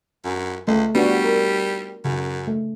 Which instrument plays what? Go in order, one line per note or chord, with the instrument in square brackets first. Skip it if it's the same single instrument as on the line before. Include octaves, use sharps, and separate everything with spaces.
[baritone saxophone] F#2
[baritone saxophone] C#2 [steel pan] A3
[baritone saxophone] G3 [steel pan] B3 D4 F#4
[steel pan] A#4
[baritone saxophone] F#2 [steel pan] C#3
[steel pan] A3